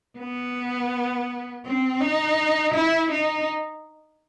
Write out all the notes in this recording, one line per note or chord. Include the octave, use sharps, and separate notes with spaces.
B3
C4
D#4
E4
D#4